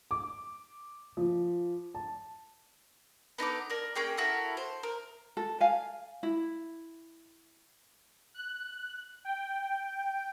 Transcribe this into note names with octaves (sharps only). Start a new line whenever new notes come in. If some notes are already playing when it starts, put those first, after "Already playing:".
D6
F3
A5
B3 D#4 A4 D6
A#4 D5
A#3 C#4 G#4 G5
E4 F#4 A4 A#4
C5
A#4
A4
F5 G#5
E4
F#6
G5